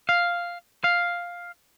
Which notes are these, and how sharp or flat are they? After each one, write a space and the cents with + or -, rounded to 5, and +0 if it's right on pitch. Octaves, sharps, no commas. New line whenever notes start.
F5 +0
F5 +5